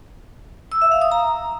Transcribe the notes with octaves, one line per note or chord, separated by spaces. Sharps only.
E6
E5
F5
D#6
A#5